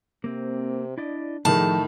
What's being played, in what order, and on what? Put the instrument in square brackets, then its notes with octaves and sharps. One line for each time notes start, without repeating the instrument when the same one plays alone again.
[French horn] C3 [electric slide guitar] A#3 C4
[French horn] D4 [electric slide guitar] E4 D5 D#5
[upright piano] A2 D#3 [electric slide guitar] F3 [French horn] G#4 [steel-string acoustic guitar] A5